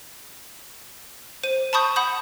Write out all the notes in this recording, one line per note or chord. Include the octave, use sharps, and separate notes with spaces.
C5 D#7
A5 B5 C#6 D#6 G6
F#5 B5 D#6 G6